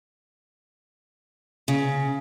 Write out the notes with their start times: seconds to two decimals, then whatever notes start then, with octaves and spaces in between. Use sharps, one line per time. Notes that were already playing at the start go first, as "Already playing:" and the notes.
1.68 C#3